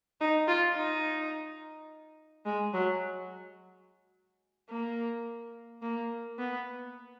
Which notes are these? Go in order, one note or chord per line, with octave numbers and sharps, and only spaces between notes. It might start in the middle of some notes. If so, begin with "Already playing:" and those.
D#4
F4
D#4
G#3
F#3
A#3
A#3
B3